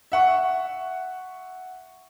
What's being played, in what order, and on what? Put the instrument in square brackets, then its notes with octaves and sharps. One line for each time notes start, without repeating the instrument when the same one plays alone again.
[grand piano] E5 F#5 C#6